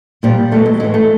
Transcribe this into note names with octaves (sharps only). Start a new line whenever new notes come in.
A#2 F3 G3
E2 B2 F#3 A3
G#3
A2 E3 G#3
A3